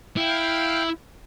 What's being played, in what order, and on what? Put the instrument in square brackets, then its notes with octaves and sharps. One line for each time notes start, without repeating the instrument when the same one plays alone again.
[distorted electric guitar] E4 [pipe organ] F5 G5